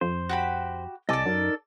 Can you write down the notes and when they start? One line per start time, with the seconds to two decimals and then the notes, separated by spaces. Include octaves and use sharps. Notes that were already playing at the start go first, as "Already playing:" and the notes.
0.01 F2 C5
0.29 F#4 G4 B5
1.09 C2 A4 D5 D#5 G#5 D6
1.26 F#2 D#4 A#4